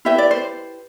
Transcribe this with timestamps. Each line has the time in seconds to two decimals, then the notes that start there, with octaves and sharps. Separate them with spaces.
0.05 E4 G4 B4 E5
0.18 D5
0.31 C5